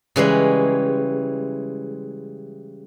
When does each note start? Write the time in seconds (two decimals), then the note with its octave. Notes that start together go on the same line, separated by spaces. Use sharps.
0.16 C#3 E3 G3 G#3